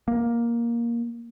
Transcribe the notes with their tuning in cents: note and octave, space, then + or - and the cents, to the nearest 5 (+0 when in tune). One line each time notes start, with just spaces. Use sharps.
A#3 +10